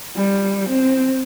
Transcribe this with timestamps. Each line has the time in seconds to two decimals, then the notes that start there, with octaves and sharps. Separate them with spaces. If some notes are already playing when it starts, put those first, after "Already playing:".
0.17 G3
0.69 C4